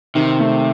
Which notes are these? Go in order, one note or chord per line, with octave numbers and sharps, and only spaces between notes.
C3 D#3
A3